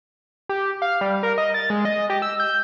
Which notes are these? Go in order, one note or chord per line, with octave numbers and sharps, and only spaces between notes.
G4
F5
G3
A#4
D#5
A6
G#3
D#5
G4
E6
G6